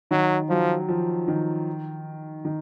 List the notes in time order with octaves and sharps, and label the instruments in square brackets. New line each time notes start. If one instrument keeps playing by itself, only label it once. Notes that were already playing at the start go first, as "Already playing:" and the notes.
[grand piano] D#3 [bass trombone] F#3
[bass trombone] F3 [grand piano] F#3
[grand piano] F3
D#3
D#3